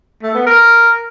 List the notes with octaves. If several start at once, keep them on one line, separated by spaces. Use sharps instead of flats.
A3
B3
A#4